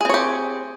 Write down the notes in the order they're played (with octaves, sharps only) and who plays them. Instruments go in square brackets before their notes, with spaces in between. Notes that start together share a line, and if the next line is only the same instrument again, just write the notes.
[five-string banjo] G#4
C4
C#5
G4